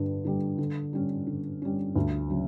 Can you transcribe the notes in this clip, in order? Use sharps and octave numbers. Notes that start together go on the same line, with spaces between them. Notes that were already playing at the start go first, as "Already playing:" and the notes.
Already playing: G2 D3 G3
D3 G3
D3
G3 C#4
D3
G3 C#4
D2
C#3 F#3